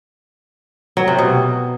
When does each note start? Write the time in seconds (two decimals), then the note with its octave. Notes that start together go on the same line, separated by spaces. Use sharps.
0.97 F#3
1.08 C3
1.18 B2